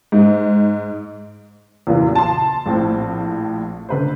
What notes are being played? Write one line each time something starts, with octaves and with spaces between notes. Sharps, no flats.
G#2
E2 A#2 C#3 E3 F#3
A5 C6
A#1 A2 C4
D3 B4 C5